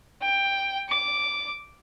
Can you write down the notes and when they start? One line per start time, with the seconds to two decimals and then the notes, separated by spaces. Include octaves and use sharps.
0.22 G5
0.89 D6